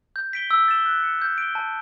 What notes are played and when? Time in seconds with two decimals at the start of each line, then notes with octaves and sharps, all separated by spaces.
0.16 G6
0.33 B6 D7 G7
0.51 E6
0.68 A6 E7 G7
0.86 F#6
1.03 C#7 E7
1.22 G6
1.38 D7 G7
1.55 A5